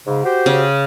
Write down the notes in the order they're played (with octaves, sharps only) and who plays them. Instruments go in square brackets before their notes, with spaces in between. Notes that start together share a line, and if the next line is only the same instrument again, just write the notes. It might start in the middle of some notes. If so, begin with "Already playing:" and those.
[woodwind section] G#2 C#3
F#4 G4 C5
[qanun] C#3